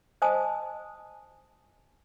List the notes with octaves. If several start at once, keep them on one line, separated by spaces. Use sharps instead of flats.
C5 D#5 G#5 A5 D#6